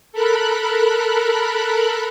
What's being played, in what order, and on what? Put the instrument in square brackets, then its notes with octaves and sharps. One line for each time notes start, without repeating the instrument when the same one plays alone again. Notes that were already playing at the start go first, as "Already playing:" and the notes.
[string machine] A4 A#4 B5 F#6